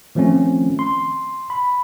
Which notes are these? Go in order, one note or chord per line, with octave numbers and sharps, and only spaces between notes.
D#3 F3 A3 C4 C#4
C6
B5